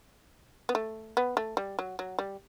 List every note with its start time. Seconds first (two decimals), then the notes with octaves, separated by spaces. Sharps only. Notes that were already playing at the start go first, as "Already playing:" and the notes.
0.69 B3
0.75 A3
1.17 B3
1.37 A3
1.57 G3
1.79 F#3
1.99 F#3
2.19 G3